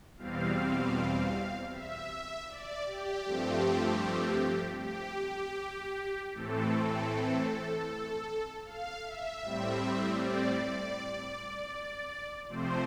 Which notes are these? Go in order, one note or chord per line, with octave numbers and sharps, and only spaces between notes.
E2 B2 G3 C4 F5
E5
D5
G4
G2 F3 A3 C4
G4
A2 E3 A3 C4 A4
F5
E5
A2 G3 C4
D5
C3 F3 A3 C4 C5